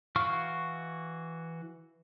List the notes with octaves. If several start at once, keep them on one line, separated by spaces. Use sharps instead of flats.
E3 F#4 F5 C#6 F6